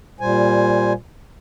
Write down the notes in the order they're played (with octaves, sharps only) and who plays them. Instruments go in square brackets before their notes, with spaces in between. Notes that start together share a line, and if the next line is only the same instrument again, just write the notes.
[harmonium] A#2 G3 C5 G#5